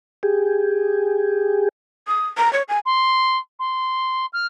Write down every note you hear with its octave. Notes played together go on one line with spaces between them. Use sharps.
G4 G#4
D#6
A#5
C#5
G#5
C6
C6
F6